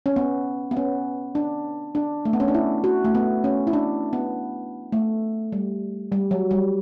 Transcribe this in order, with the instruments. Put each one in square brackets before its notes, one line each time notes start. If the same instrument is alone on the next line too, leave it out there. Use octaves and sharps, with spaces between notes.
[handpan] C#4
B3
B3
C#4
D4
D4
A3
B3
C#4
D4
E4
F#4
A3
B3
C#4
E4
D4
B3
A3
G3
G3
F#3
G3